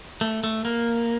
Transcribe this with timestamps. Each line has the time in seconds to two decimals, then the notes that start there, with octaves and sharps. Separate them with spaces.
0.21 A3
0.44 A3
0.65 A#3